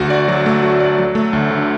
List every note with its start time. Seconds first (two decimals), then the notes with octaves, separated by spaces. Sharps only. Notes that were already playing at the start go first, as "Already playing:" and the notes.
Already playing: D2 F#4
0.10 D5
0.28 F#3
0.46 A3
0.63 F#4
0.80 D5
0.98 F#3
1.15 A3
1.33 D2
1.51 D3